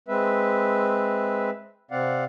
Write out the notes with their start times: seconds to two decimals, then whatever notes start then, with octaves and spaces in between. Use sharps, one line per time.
0.08 G#3 C4 B4 E5
1.91 C3 C4 D5 F5 F#5